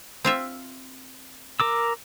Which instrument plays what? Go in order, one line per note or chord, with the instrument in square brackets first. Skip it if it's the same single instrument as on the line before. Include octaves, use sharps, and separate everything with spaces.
[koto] C4 F4 E5
[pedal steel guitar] A#4 D6 E6